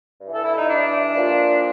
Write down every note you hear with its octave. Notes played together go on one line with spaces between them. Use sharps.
G2 E3
A4
E4
D#4
D4
A#2 F3